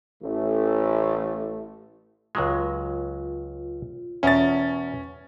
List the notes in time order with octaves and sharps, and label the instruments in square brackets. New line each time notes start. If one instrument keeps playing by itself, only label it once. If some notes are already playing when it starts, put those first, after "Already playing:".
[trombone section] A1 A3
[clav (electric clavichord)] C#2 F#3 G#3 [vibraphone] F4
[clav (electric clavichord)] E2 B2 A#4 [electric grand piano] C#4 A6